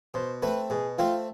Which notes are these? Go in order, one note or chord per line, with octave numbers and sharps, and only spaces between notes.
B2 C5
A3 C4 B4
B2 G#4
A3 C4 F4